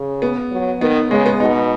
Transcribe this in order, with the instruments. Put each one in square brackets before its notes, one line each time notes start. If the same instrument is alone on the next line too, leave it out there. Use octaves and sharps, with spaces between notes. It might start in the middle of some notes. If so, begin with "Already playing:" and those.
Already playing: [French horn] C#3
[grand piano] B3
[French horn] F#3
[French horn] D#3 [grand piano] B3
[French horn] C#3 [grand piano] G#3
[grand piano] B3
[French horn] B2 [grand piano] D#4